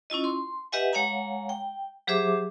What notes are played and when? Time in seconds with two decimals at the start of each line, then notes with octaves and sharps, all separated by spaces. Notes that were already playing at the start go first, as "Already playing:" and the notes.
0.10 C#4 E4 F4 D#5
0.24 C6
0.72 G4 B4 D#5 E5 F#5 G#5
0.93 G#3 C#5 F5 F#5 G#5 A#5
1.49 G5
2.07 F#3 G4 G#4 C5 E5 D6